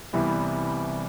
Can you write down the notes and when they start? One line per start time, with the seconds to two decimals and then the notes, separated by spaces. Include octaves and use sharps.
0.13 C2 C3 E3 G3 B3